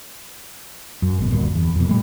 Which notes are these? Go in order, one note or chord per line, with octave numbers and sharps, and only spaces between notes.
F#2
G#1 B2
G1 D2 G2 A#2
E2
F2 B2
A#2 G3 A3